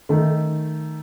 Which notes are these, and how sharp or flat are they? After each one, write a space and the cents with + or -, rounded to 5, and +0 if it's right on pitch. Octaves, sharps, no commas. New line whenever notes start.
D#3 +0 A3 +0